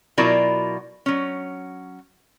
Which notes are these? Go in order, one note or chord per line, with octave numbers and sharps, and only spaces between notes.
B2 F#3 E4 F4 A#4 D5
F#3 C#4